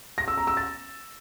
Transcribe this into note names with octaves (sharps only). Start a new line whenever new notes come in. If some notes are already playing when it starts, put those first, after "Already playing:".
A#6
E6
A#5
E6
A6